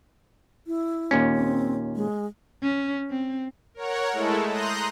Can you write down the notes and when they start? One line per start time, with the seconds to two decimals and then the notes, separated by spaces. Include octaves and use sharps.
0.67 E4
1.11 D#2 A#2 C#4
1.34 C4
1.96 G#3
2.62 C#4
3.10 C4
3.74 A#4 C#5 F#5
4.12 G#3 A3 E4 A4
4.47 A#5 C6 D#6 F#6 G6 A#6